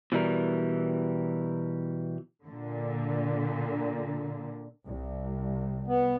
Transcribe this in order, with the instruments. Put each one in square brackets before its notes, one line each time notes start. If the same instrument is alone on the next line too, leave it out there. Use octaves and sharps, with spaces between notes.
[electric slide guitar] B2 E3 G3 A#4
[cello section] A#2 D3
[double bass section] C2
[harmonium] B3